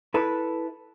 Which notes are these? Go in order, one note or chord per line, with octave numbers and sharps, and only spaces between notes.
E4 A4 B4